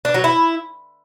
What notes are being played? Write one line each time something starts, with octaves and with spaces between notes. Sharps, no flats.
D4
F#3
E4